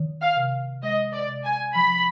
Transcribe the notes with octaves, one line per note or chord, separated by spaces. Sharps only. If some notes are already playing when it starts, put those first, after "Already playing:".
Already playing: D#3
F5
C3
G#3 D#5
D5
C3
G#5
F3 B5